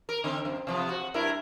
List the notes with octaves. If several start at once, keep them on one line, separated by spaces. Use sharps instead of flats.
A#4
D3 C4
F#2
C3 F3 B3
F#4
G2 E4 A#4